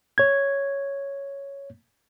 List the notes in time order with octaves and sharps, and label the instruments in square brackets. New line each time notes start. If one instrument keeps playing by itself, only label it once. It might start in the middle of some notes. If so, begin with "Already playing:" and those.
[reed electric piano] C#5 G#6